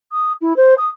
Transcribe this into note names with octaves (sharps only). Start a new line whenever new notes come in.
D#6
E4
C5
D#6